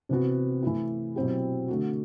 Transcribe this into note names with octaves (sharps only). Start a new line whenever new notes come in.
C3 E3 B3 F#4
E3 A3 E4
B2 F#3 C4 E4 G4
D3 A3 D4 F#4